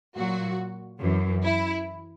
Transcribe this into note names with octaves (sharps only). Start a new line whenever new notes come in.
A#2 F#3 F#4
F#2 E3
E4